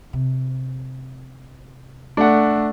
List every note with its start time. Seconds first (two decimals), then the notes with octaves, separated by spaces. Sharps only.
0.13 C3
2.17 A3 D4 F#5